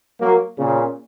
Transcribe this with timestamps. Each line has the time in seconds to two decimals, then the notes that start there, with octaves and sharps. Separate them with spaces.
0.20 F#3 A#3
0.58 A#2 C#3